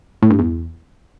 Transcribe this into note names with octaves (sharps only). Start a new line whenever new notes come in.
A2
G2
E2